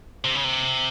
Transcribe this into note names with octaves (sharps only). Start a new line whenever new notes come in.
C3
C#3
C3